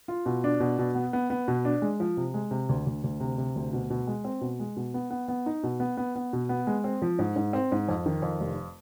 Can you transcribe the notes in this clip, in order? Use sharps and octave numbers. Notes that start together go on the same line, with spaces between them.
F4
B2
D4
B2
B2
B3
B3
B3
B2
D4
G#3
F3
C3
G#3
C3
D2
D2
D2
C3
C3
D2
B2
B2
G#3
C4
B2
G#3
B2
B3
B3
B3
D#4
B2
B3
B3
B3
B2
B3
G#3
C4
F3
G#2
G#2
C4
G#2
F2
D#3
F2
F1